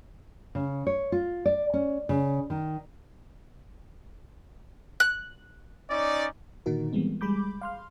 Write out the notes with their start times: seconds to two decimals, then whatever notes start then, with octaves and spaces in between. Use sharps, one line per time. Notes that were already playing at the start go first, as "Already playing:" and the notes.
0.55 C#3
0.87 C#5
1.12 F4
1.46 D5
1.74 C#4
2.09 C#3
2.50 D#3
5.00 F#6
5.90 C#4 D#4 D5
6.66 A#2 D3 D#3 D#4 F#4 A#4
6.93 E3 G3 G#3 B3 C4
7.21 G3 G#3 G#4 B5 D6 G6
7.61 F5 C6 F6